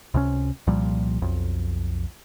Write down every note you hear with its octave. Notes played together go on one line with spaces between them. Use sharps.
C#2 C3 F#3 C#4
C2 A#2 F3 G3
B1 F2